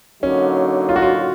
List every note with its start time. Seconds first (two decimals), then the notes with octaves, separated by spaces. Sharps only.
0.22 D3 F#3 A#3 C#4 D#4
0.89 F4
0.96 F#4
1.02 F4